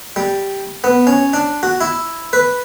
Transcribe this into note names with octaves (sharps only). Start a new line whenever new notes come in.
G3
B3
C#4
D4
F#4
E4
B4